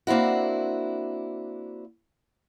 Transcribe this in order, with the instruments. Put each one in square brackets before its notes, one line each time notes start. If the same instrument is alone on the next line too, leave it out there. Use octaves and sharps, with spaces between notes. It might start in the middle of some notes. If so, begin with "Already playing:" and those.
[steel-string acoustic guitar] A#3 C4 D4 E4 F#4